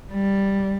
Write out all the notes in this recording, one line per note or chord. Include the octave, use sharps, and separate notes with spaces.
G3